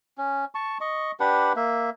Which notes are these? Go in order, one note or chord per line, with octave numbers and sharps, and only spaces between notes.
C#4
A5 C#6
D#5 C#6
D4 G4 B4 F#5
A#3 E5